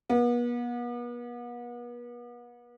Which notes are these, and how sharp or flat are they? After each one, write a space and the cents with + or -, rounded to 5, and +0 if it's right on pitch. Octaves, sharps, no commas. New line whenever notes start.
B3 -40